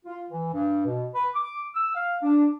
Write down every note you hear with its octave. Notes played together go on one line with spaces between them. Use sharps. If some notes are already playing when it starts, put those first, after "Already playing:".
F4
E3
G2
B2
B4
D6
E6
F5
D4